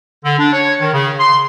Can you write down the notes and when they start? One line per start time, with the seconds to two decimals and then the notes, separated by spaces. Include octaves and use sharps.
0.24 D3
0.39 D4
0.53 C#5
0.80 D#3
0.93 C#3
1.19 C6